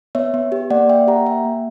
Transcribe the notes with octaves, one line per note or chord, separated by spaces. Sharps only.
B3 C#5 E5
B3
G4
A#3 D5 F#5
A#3 E5 G5
G4 F#5 A#5
A#3 E5 G5
A#3